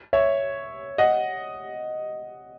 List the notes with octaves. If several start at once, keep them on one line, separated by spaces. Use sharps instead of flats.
C#5 E5
D#5 F#5